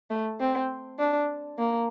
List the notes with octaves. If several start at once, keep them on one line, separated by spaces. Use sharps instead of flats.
A3
C4
D4
A#3